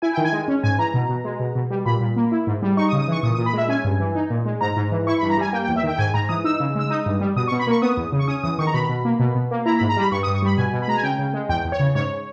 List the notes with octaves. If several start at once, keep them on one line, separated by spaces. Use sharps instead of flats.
E4 G#5
D#3 G5
G#5
G#3
C#4
G#2 G#5
E3 A#5
B2
B2
G#3
B2
B2
G3
A#2 B5
A#2
A#3
E4
G#2
G3
D#4 C#6
D#6
C#3
D#6
E3 C#6
A#2 D#6
D#6
A#2
B5
G#3 E5
C#4 G#5
G2
E3
D#4
A#2
G#3
G#2 A#5
G#2
E3
E4 C#6
B5
G2
A#5
G3 G#5
A#3 G5
G5
E2
E5
D#3 G5
G5
G#2 G#5
G#2 A#5
E3 D#6
D#4 E6
C#3
G#3 E6
D#4 D#6
G2
G3
B2 D#6
C#6
B2
B5
A#3 C#6
B3 D#6
E2
C#3
C#6
C#4 D#6
E2 D#6
D#3 C#6
A#5
B2 B5
B2
A#3
B2
B2
A#3
E4 A#5
B5
G#2
A#5
G3 B5
G2 C#6
D#6
G2
C#6
G3 B5
B2 G#5
B2
B5
G#3 A#5
G#5
C#3 G5
C#3
G#3
E2 G5
E2
C#5
C#3
G#2 C#5